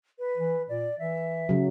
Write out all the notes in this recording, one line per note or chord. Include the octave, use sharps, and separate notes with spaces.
B4
E3
A#2 D5
E3 E5
C#3 F#3